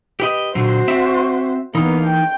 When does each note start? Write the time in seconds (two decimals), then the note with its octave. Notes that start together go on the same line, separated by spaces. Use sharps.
0.20 G4 B4 D#5
0.55 A#2 D3 F#3 F#4 C5
0.88 C4 E5
1.75 E3 A#3 B3 D#4
2.06 G5